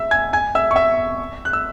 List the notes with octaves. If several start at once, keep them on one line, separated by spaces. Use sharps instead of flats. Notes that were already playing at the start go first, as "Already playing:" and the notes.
Already playing: E5 E6
G#5 G#6
G#5 G#6
E5 E6
C#6
E5 E6
F#6
E6